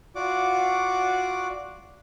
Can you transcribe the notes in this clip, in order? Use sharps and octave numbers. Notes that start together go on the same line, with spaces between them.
F4 F#4 D5 F#5 D6